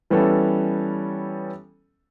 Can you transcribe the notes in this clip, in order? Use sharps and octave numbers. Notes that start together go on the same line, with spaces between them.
E3 G3 B3 C#4 A4